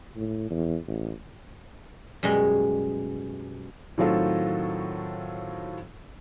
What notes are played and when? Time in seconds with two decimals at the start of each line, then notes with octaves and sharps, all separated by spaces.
0.16 A2
0.50 E2
0.88 A1
2.23 F#2 B2 G3 G#3
3.98 A2 D#3 F#3 C4 F4 A4